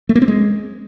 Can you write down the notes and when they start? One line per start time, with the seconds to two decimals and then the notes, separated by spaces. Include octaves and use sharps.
0.09 A3
0.15 A#3
0.22 C4
0.28 G#3